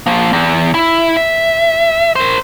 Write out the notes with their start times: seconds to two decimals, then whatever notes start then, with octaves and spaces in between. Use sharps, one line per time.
0.06 F3 A#3
0.33 E2
0.74 E4
1.17 E5
2.16 A#4 C5